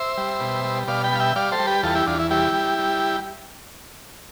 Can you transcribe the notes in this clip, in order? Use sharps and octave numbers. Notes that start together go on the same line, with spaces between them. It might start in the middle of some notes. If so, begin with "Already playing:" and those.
Already playing: C5 E5
G3
B2
G3
B2 D5 F5
G5 B5
G3 F5
E5 G5
G3 D5 F5
A4 C5
G3
G4 B4
E2 F4 A4
E4 G4
E2 D4 F4
E4
G3 E4 G4
G3
G3